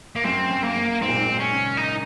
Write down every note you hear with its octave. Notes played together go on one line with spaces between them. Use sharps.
A#3
F#2 C4
F#2
A#3
F#2
G#2 C4
A#2
G#2
A#2
C#4
C#3
D#4